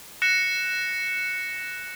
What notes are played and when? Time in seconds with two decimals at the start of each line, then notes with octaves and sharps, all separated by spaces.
0.22 F#6 A#6 C#7 E7